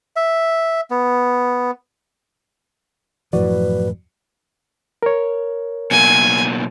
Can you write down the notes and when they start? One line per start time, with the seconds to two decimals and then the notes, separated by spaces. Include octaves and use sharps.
0.16 E5
0.91 B3
3.33 F#2 A2 E3 F3 F#4 B4 D5
5.03 A#4 C#5
5.91 B2 F#3 A#3 G#5